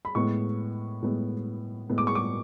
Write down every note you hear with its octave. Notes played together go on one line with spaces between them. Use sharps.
B5
A2 G#3 B3 C#6
A2 G#3 B3
A2 G#3 B3
D6
C#6
D6